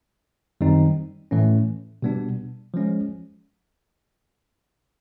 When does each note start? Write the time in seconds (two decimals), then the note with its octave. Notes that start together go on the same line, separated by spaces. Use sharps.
0.61 F#2 D#3 G3 C4 D#4
1.31 A2 E3 A3 C#4
2.02 B2 G3 B3 D4
2.74 F3 G#3 C#4